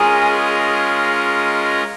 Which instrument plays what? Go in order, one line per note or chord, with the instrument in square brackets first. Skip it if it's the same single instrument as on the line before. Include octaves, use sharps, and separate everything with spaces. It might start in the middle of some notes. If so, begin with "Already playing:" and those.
Already playing: [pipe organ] G#3 C#4 F4 A#4 D#5 [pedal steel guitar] G#4